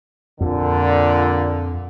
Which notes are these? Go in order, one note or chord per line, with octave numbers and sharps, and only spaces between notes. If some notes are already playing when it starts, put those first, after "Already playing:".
F2 A#2 D3